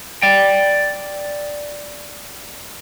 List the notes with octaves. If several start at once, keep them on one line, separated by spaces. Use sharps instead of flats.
D5 G5